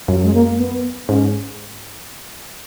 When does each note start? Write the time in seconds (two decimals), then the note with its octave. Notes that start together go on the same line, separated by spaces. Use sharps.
0.08 F#2 F#3
0.24 G#3
0.34 A#3
0.55 A#3
0.59 B3
1.09 G#2 C#4